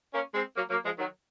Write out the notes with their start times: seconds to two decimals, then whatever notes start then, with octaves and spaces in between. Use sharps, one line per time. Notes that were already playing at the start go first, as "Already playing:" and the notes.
0.13 A#3 C#4
0.34 G#3 C4
0.56 F#3 A#3
0.70 F#3 A#3
0.84 F3 G#3
0.98 D#3 F#3